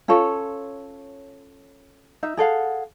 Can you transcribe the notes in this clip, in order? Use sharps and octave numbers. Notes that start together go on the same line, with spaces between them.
C#4 F4 A4 C#5
D#4 E5
G#4 A4 F5 F#5